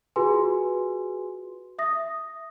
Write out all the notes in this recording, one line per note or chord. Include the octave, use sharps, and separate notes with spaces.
F4 F#4 G#4 B4 G#5 C6
E5 D#6 A#6